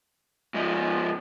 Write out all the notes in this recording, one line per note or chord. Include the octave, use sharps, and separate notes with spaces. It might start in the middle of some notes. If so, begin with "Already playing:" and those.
G#2 F3